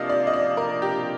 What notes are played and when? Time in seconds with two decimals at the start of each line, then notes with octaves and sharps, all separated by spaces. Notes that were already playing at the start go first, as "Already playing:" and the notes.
Already playing: C3 F3 A#3 D4 D#5 F5
0.09 D5
0.27 D#5
0.33 D5
0.57 A#4
0.82 G4